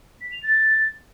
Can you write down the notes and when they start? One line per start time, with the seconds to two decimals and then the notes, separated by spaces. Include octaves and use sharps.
0.21 B6
0.32 F7
0.43 A6